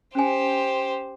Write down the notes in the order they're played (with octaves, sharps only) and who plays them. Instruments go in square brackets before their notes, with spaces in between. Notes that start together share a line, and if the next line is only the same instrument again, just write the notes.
[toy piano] C#4 G#5 [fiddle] G4 C5